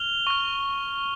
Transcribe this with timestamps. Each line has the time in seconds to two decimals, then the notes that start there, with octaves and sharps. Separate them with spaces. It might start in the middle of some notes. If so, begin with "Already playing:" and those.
Already playing: F6 F7 G7
0.27 C#6 F6